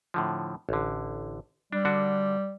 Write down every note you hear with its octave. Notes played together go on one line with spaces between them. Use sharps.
A2 D3 F3
A1 D3
G3 D4
D3 D4 F#4